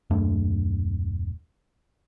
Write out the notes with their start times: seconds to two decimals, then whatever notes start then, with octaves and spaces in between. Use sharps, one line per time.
0.10 D#1 F#2 A3 D4